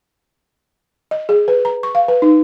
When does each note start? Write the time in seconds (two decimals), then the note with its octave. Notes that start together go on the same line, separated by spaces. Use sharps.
1.11 D#5
1.29 G#4
1.48 B4
1.65 A#5
1.83 C#6
1.95 F5
2.08 B4
2.22 D#4